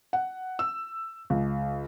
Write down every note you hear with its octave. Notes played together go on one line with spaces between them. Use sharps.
F#5
E6
C#2